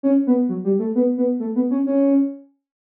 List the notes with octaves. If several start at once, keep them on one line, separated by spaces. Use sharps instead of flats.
C#4
B3
F#3
G3
A3
B3
B3
A3
B3
C#4
C#4